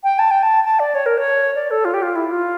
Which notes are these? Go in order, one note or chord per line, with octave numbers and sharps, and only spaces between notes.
G5
A5
G5
A5
A5
D5
C#5
A#4
C#5
D5
A4
F4
G4
F4
E4
F4